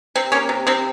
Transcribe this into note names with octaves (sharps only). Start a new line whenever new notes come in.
C3 C4
A#3 C#4
C3
C3 C4